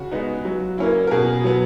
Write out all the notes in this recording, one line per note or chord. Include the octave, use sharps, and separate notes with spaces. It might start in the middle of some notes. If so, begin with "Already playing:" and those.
Already playing: C#3 F#4
G#3 B3 D#4
F#3
A#3 C#4 E4
A#4
B2 G#4
F#3 B3